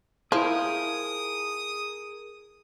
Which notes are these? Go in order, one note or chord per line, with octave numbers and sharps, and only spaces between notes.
F3 E4 G#4 A#4 C5 D#6